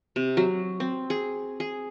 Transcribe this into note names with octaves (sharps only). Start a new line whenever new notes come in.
C3
F#3
C4
G#4
G#4